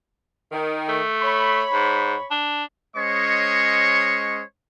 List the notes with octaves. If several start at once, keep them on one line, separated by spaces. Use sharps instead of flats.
D#3
A3
C#5 B5
G#2
D4
G#3 C#4 C5 C#5 D#5 C#6